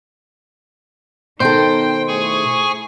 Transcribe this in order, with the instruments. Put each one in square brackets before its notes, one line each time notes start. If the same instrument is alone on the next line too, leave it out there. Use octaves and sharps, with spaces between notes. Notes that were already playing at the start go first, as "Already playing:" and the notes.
[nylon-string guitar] B2 D#3 A4 [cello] D#4 [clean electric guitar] C5 [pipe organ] G5
[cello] A3 E4 [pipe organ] G#4 G#5 C#6